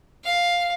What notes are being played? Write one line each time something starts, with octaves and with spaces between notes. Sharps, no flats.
F5